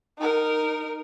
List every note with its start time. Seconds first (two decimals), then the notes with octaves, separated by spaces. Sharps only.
0.18 D#4 A#4